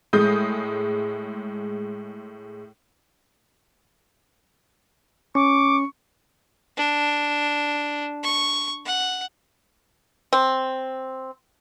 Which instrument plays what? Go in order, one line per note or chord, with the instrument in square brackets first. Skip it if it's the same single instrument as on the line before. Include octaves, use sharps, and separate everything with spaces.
[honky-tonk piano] A2 G#3 D#6 G6
[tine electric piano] C#4 [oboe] C#6 [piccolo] D6
[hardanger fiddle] D4
C#6
F#5
[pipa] C4